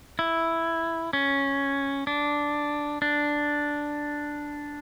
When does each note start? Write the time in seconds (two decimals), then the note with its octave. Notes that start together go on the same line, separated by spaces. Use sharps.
0.19 E4
1.13 C#4
2.07 D4
3.02 D4